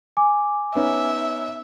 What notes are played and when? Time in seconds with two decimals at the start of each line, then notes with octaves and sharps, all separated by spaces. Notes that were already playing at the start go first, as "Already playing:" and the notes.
0.17 G#5 D6
0.75 B3 C#4 D#4 E5